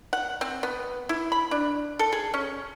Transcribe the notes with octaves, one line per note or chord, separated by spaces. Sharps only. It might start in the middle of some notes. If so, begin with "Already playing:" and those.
F#5
C4
B3
E4
B5
D4
A4
G#4
C#4